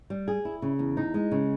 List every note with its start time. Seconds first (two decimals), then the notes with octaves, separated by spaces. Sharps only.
0.10 G3
0.28 G#4
0.45 E4
0.62 C#3
0.79 E2
0.97 D#4
1.14 G#3
1.31 C#3